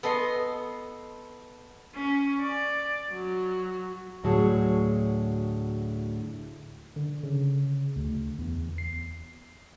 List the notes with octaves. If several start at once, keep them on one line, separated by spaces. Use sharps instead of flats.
B3 A4 D#5 C6
C#4
D5
F#3
D2 A2 F#3 F#4 G#4 A5
D3
C#3
D2
E2
C7